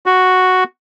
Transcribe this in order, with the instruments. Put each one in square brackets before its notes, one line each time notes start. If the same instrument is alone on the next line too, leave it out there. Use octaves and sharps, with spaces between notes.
[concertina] F#4